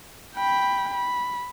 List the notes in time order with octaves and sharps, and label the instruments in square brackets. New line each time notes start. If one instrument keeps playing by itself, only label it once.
[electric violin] G5 B5
B5